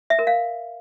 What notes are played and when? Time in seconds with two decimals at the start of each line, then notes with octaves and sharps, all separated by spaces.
0.10 E5
0.19 A#4
0.27 F5